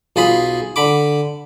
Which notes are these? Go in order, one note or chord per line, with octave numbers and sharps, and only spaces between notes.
B1 F4 G#4 B5
D3 B5 D6